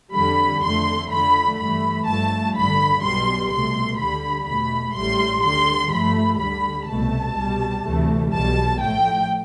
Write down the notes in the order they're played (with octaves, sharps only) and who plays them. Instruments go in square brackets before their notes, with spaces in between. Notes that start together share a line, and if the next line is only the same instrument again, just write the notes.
[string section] F2 D3 G3 B5
F2 D3 A3 C6
F2 D3 F3 A3 B5
G2 E3 A3 B5
G1 G2 F3 A3 A5
A1 G2 D3 B5
B1 B2 G3 C6
C2 B2 A3 C6
D2 D3 G3 B5
E2 B2 A3 B5
A1 A2 G3 C6
D2 D3 G3 C6
G2 F3 A3 B5
D2 D3 G3 B5
C2 B2 A3 A5
C2 B2 G3
D2 C3 E3 A3
B1 B2 G3 A5
A1 A2 F3 A3 G5